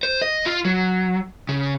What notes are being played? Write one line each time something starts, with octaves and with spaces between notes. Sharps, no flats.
C5
D#5
F4
F#3
C#3